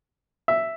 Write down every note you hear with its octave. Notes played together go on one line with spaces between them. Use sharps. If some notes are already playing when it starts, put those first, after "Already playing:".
E5